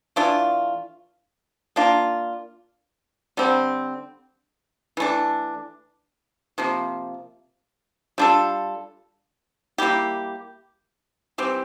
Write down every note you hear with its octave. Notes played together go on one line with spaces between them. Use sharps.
E3 A3 D4 F4
A#3 D4 F4
D3 G3 C4
E3 A3 D4
C3 F3 A#3
G3 D4 F4 A4
G3 A#3 E4 G4
E3 G3 C4 G4